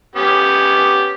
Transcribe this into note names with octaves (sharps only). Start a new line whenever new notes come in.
B3 C#4 G4